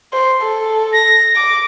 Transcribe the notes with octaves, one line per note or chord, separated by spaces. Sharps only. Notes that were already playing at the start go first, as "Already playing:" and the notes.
C5
A4
A#6
D6